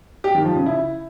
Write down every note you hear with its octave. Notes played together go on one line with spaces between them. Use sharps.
G4
D#3
F3
C#3
E4